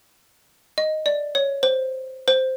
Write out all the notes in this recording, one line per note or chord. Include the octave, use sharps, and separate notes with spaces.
D#5
D5
C#5
C5
C5